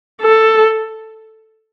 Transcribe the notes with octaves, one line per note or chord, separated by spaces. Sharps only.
A4